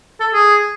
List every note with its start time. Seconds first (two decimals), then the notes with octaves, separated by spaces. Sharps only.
0.20 A4
0.34 G#4